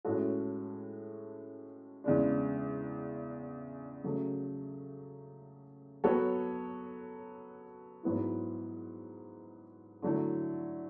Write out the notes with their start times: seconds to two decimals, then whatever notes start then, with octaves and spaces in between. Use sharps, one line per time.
0.05 A2 G#3 C#4 F#4 A4
2.04 E2 C#3 G#3 D4
4.04 C#3 F#3 A3
6.04 F#3 B3 F#4 A4 C#5
8.03 G#2 F#3 B3 E4
10.02 D3 F#3 A3 E4